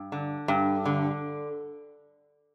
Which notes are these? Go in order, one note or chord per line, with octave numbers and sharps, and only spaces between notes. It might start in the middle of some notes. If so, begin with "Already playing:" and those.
Already playing: G2
D3
G2
D3